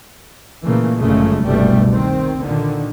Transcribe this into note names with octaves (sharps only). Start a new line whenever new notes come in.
A#2 C#3 E3 A3 A#3
G1 F#2 A#2 C#3 G#3 A3
F#1 C2 G2 B2 G3 A3
D#3 C4
A#2 D3 D#3